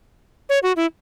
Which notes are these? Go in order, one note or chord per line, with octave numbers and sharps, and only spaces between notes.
C#5
F#4
E4